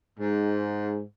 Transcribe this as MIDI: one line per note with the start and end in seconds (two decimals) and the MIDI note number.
0.19 1.02 44